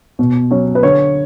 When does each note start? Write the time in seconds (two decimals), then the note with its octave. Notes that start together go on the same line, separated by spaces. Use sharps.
0.19 B2
0.51 F#3 C#4
0.75 B4
0.83 D3 C#5